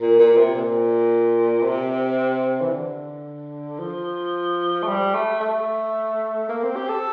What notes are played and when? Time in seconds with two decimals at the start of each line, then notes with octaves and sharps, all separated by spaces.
0.01 A#2
0.19 A#2
0.37 C3
0.55 A#2
1.63 C3
2.62 E3
2.72 D3
3.79 F3
4.83 A3
4.87 G3
5.14 A3
5.40 A3
6.49 A#3
6.63 C4
6.76 G4
6.89 A4